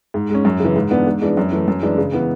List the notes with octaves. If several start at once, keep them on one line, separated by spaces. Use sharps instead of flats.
G#2
G#3 C#4
F#2
C#3 E3
G#2
E3 B3 D4
G#2
E3 G#3 D4
F#2
E3 A3
F#2
E3 G#3 D4
C#3
E3 B3